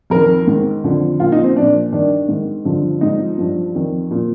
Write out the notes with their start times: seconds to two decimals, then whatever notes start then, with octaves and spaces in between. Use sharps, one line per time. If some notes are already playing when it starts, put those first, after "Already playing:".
0.10 F2 D#3 A#4
0.47 G#2 D#3
0.84 F2 D3 F3
1.19 A#2 F3 F4
1.32 D#4
1.43 C4
1.56 A#2 F3 D4
1.92 G2 D#3 D4
2.28 G#2 D#3
2.65 G2 D3 F3
3.01 G#2 F3 D#4
3.38 G2 F3
3.75 F2 D#3
4.11 A#2 F3